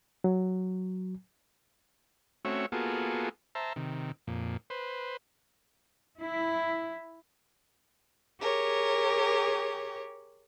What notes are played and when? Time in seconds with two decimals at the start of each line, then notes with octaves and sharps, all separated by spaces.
0.24 F#3
2.45 A3 C4 C#4 F#4 C#5 E5
2.72 A#3 B3 F4 F#4 G#4 A4
3.55 C5 E5 A5 A#5
3.76 C3 D#3
4.27 F2 A#2
4.70 B4 C5
6.20 E4
8.40 G4 G#4 A#4 C#5